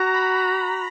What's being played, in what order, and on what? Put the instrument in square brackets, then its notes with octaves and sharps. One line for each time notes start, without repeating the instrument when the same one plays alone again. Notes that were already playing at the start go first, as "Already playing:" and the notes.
Already playing: [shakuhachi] F#4 [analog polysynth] A#5
[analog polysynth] B5
A#5